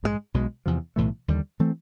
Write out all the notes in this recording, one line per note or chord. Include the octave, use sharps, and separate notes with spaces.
A#1 G#2 D#3 G#3
B1 B2 G#3
E2 C3 F3
B1 A2 E3 A3
D#2 D3 G3
E3 A3 C4